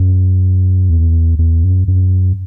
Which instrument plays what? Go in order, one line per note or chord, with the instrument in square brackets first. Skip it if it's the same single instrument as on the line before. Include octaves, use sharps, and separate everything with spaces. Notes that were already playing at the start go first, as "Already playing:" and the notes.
Already playing: [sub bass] F#2
E2
E2
F#2
F#2